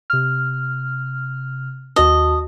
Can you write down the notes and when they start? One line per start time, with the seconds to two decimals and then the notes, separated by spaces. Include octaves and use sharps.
0.10 C3 F6
1.96 D#2 F#4 D#5 A5